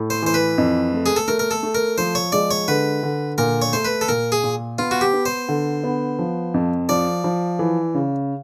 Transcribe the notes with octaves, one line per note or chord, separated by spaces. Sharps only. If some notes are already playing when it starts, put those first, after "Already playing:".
Already playing: A2
C5
E3 C5
B4
F2
A3
G#4
A4
A3 A#4
A#4
A4
A3
A#4
F3 C5
C#5
G#3 D5
C#5
D3 B4
D3
A#2 A#4
C#5
A3 C5
B4
A4
A#2 A#4
G#4
A#2
B3 F4
F#4
G4
B3
C5
D3
B3
F3
F2
F3 D5
F3
E3
C#3